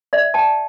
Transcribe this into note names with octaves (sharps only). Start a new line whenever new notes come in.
D5 E5
G5 A5